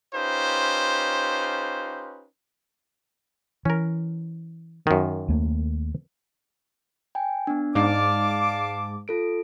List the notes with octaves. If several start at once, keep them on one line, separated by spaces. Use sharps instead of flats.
C#4 D#4 F4 G4 B4 C5
E3 C#4 A#4
F#2 D#3
D#2 A3 A#3
G5 G#5
B3 D4
G#2 D5 F5 A5 D6
F4 A4 D7